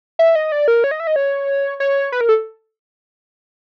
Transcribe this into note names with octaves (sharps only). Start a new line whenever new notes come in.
E5
D#5
D5
A#4
C#5
D#5
E5
D#5
C#5
C#5
B4
A#4
A4